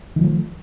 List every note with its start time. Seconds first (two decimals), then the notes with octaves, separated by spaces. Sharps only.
0.16 D#3
0.19 G3
0.21 F3
0.24 A3